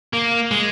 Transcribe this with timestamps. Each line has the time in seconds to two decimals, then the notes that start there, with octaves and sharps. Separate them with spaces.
0.13 A#3
0.51 G#3